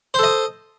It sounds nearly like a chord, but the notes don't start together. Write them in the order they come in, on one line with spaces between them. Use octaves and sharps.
C5 A4 D#5